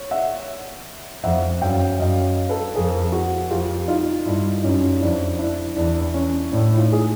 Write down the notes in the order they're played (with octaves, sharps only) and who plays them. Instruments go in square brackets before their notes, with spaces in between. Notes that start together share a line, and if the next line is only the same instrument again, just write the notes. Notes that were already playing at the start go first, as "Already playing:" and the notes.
Already playing: [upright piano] C#5
E5 F#5
[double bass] F2 [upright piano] E5 F#5
[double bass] F#2 [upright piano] F5 G5
[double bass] F#2 [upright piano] D#5 F5
[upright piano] A4 B4
[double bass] F2 [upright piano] G#4 A#4
[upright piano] F#4 G#4
[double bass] F2 [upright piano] F4 G4
[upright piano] D#4 F4
[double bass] G2 [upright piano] D4 E4
[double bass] F#2 [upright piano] C#4 D#4
[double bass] F2 [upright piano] D4 E4
[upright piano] D4 E4
[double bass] E2 [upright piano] D4
[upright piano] C#4
[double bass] A2 [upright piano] D4
[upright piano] D#4 F4
G#4